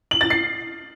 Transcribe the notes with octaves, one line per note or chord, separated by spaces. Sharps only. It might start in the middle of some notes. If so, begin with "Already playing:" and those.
F#7
A6
C7